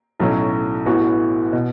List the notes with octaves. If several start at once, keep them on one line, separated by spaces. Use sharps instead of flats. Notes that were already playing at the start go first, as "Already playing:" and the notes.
B1 A2 F#3 C#4
A1 A2 E3 B3 F#4
B2